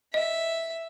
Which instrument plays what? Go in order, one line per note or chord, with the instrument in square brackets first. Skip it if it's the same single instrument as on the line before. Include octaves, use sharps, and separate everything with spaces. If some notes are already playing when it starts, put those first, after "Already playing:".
[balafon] D#5 [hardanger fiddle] E5